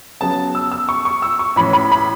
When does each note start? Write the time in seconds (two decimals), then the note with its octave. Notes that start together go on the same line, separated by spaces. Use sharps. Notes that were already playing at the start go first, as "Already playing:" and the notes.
0.21 C#3 F#3 B3 A5
0.55 E6
0.72 E6
0.89 C#6
1.05 C#6
1.22 E6
1.39 C#6
1.56 A2 E3 C#4 B5
1.73 B5
1.92 B5